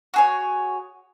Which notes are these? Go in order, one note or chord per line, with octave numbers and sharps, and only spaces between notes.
F#4 G#4 C#5